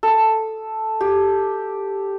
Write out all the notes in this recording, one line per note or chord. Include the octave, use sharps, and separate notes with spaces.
A4
G4